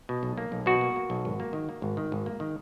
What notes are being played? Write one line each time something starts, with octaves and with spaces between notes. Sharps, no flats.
B2
B1
A#3
B1
B2 F#4
A#3
A#3
B1
G#1
A#3
D#3
A#3
G#1
D#3
G#1
A#3
D#3